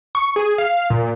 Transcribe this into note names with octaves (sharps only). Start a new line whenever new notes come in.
C#6
G#4
F5
A#2